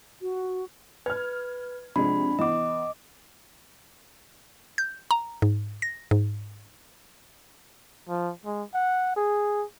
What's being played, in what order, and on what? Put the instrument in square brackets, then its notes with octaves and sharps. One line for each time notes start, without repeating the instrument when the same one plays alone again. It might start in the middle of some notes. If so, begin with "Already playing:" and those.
[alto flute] F#4
[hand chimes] B4 [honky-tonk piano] F6 G#6
[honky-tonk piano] C3 F3 G#3 [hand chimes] D4 B5
[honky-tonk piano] E3 B3 [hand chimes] D#5 D6
[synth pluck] G6
A#5
G#2
A#6
G#2
[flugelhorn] F3
G#3
F#5
G#4